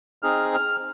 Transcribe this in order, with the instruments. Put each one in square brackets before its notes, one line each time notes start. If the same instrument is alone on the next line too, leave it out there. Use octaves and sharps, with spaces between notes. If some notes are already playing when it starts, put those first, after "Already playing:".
[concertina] C4 D#4 G#4 F6
F6